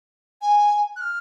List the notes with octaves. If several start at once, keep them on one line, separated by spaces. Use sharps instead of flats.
G#5
F#6
F6